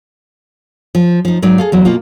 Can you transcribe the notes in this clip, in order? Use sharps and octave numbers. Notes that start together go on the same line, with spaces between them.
F3
F3 D#4
G#2 F#3 D#4 D5
G#4 A4 F5
E2 F#3
B2 A#3 F4